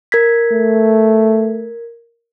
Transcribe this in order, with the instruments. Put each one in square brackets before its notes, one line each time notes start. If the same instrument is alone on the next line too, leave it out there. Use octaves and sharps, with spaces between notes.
[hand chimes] A#4 G#6 B6
[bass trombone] A3